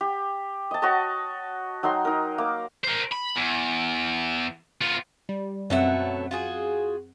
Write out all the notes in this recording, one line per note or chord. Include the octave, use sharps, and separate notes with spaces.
G4
D#5 A5
F#4 C#5 D#5 A5
F#3 D#4 G5 C6
D#4 A#4
A#3 D6
A#4 C5
B5
E2
B3 F4
G3
F#2 B2 F#3 A3 C4 F#5
F4 F#4 G#4